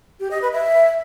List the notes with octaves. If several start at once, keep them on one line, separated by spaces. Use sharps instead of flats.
G4
D#5
B4
E5